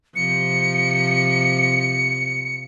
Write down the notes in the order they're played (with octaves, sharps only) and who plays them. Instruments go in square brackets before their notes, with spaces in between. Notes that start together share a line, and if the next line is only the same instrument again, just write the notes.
[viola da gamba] C3 F3 [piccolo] C#7